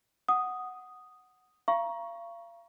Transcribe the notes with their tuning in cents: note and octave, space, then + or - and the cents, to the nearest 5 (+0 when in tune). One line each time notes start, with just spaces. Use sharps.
F#5 +0 D#6 +0
F5 -35 A#5 +20 C#6 +0